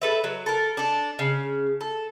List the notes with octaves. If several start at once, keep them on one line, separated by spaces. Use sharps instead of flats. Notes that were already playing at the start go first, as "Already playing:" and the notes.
A4 B4 E5
F#3
A4 A#4
D4 A4
C#3
A4